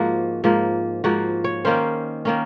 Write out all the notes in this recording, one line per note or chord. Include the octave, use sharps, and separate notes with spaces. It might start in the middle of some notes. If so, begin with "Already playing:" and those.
Already playing: G#2 F3 A#3 F#4
G#2 F3 A#3
G#2 F3 A#3 F#4
C#5
D#3 A#3 C#4 C5
D#3 A#3 C#4